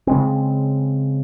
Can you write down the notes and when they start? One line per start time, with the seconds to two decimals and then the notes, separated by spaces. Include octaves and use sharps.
0.07 C#3 G#3 C4